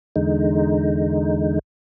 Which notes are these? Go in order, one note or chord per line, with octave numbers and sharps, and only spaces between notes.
E2 D3 G#3 D#4